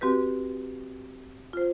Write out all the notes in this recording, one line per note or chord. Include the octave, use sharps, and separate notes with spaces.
C4 F#4 G4 B4
F4 C5